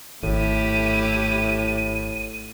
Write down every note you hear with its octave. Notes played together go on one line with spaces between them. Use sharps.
G#1 A2 A3 E4 G4 D#7